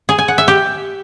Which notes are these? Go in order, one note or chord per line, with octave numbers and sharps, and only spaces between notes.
G#4
G#5
F#5
E5
G4